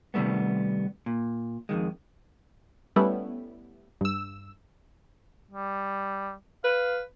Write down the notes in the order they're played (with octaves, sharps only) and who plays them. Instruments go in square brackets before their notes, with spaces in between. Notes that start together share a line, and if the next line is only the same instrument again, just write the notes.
[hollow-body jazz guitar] C3 D#3 G3 A3 B3
A#2
F2 G#2 D#3 G#3
[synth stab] G3 A3 B3 C#4 E4
G2 E6
[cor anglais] G3
[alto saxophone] B4 [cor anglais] F5